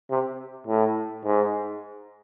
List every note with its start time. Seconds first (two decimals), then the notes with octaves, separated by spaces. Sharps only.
0.10 C3
0.67 A2
1.24 G#2